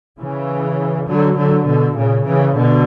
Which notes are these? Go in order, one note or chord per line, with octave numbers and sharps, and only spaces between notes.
C#3 E3
D3 F#3
D3 F#3
B2 D3
A#2 C#3
C#3 E3
B2 D3